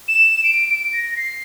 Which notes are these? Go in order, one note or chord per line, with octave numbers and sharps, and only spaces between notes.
E7
D7
D7
A#6
A#6
C7